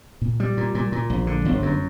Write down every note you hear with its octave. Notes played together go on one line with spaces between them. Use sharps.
A#2
G3
A#2
A#2
A#2
A#1
D3
G1
F#2